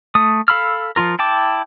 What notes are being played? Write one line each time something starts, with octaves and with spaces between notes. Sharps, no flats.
A3 D#6
A4 F5 B5 E6 F6
F3 A3 F4 A#4
E4 G5 A5 D6